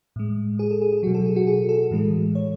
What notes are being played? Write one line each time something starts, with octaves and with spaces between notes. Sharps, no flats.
A2 G#3
G#4
A4
G#4
G#4
B2 F#3 F#4
A4
G#4
F#4
G#4
A4
A2 E3 G#3
C#5